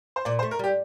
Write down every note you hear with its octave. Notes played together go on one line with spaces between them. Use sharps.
C5
A#2 D5
C5
A3
A#4
G3 G4